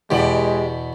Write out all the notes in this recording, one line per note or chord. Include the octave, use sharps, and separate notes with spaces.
E2 B2 G#3 G4 D5